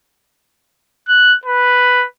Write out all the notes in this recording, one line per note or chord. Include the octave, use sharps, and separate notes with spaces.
F#6
B4